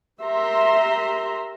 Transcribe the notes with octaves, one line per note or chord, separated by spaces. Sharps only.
G4 A#4 E5 A#5 C6